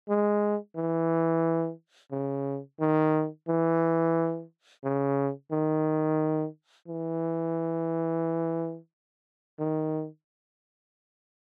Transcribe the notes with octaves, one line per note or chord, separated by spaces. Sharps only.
G#3
E3
C#3
D#3
E3
C#3
D#3
E3
D#3